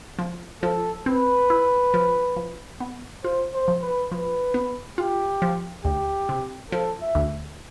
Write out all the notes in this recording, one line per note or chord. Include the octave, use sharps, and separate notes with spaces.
F3
F3 A4
C4 B4
E4
F3
F3
B3
F4 C5
C5
F3
B4
F3 B4
B3
F4 G4
F3
D2 G4
C3
F3 A4
E5
D2